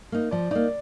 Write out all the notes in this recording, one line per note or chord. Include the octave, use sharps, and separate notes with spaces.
A#3 D#4
F3 D5
A#3 D#4 D5